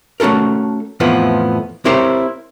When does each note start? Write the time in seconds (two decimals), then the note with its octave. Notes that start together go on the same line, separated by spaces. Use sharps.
0.20 A3 C#4 F#4 A4 A#4
1.00 F2 A2 E3 F3 A3 B3
1.85 C4 E4 G4 A#4 C5 C#5